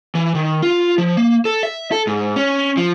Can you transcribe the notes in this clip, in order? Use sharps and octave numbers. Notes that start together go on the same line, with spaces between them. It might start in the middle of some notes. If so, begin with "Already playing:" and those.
E3
D#3
F4
F3
A#3
A4
E5
A4
G#2
C#4
F3